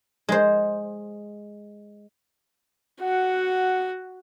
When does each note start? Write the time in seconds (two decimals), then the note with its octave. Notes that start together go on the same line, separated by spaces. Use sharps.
0.29 G#3 C5
3.02 F#4 F#5